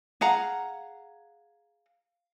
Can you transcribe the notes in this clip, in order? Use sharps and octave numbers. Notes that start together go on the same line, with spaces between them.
G#4 F5 F#5 A#5